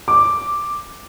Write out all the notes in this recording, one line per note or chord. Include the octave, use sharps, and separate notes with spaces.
D6